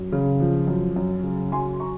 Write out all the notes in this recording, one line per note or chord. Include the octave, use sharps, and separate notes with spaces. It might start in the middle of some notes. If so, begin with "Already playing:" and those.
Already playing: F#2
C#3
F3
F#2
F#2
C#3
F#3 G#5 C6
A#5 C#6